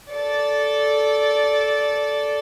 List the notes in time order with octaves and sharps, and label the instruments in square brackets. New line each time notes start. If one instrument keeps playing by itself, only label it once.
[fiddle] A4 D5